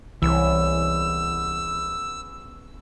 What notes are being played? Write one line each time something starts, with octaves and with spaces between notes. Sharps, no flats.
C2 E3 B3 C#4 G#4 E6